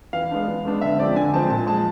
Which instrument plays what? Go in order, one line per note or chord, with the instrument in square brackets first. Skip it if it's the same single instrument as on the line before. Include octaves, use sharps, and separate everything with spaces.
[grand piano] E3 F5
G#3 B3 D4
E3
G#3 B3 D4
D3 E5
F3 G#3 C4 D5
D3 G#5
F3 G#3 C4 A5
A#2 A5
F3 G#3 A5